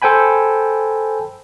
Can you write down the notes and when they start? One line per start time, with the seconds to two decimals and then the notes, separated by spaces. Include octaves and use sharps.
0.02 A4 C5 G5 G#5 B5